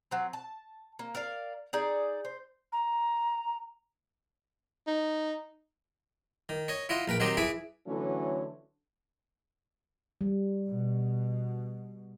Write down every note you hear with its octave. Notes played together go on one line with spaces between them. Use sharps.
F#3 C4
A5
A#3
A#4 D5 F5
D#4 G#4 D5
C5
A#5
D#4
D#3
C#5 D#5
E4 F4 D#5 F#5
A#1 A#4 B4 G5
D#3 F#3 C4 F#4 G4 D#5
E3 E4 G#4 E5 G#5 D6
D3 E3 F#3 A3 C#4
G3
B2